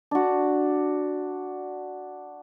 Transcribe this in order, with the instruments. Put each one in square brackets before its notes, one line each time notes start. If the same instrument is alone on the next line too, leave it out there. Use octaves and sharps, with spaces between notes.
[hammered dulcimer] D4 F#4